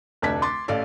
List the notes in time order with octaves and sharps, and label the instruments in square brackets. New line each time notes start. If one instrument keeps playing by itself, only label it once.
[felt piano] F1 D2 D4 A5 G#6 B6
C6 D6 A6
A1 A4 D5 F5